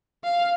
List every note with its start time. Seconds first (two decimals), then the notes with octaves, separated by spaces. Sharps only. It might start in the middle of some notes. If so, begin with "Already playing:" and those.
0.24 F5